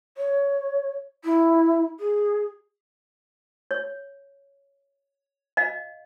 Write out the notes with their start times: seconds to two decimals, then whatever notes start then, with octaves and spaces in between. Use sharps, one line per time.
0.17 C#5
1.24 E4
2.00 G#4
3.71 C#5
5.57 D#5 F5